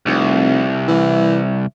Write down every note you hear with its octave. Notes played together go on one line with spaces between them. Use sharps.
F1 C2
E3